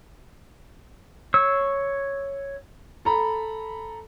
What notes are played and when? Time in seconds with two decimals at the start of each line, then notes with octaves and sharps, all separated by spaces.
1.34 C#5 E6
3.05 A4 A#5 B5